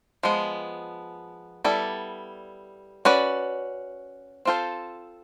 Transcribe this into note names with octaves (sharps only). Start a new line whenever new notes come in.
F3 G#3 B3
G3 B3 E4 A4 D5
C#4 F#4 B4 D5
C4 F4 A4 C5